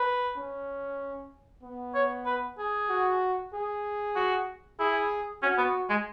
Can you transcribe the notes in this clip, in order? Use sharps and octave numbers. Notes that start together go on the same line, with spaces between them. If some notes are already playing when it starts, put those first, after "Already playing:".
Already playing: B4
C#4
B3
C#5
B4
G#4
F#4
G#4
F#4
E4 G#4
C#4 F#4
B3
G#3